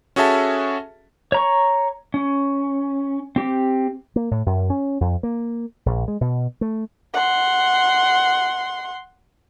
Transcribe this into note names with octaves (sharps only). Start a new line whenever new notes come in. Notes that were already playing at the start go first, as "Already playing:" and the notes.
C#4 F#4 G#4 A4 E5 A5
C#5 A#5 C#6
C#4
C4 G4
A#3
A2
F#2
C#4
F2
A#3
A#1
G#3
B2
A3
F#5 C6